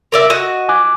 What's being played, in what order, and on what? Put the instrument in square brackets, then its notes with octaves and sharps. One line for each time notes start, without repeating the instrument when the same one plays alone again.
[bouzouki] A#4 D5 E5
F#4 D#5
[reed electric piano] G#5 D6 F#6